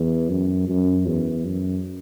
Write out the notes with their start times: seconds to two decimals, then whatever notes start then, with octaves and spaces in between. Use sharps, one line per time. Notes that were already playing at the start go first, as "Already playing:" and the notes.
Already playing: E2
0.29 F#2
0.69 F#2
1.06 E2
1.45 F#2